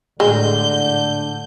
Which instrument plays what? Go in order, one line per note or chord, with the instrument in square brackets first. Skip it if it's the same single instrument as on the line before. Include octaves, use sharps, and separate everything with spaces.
[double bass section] A2 [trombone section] D3 [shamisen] G#3 [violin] G6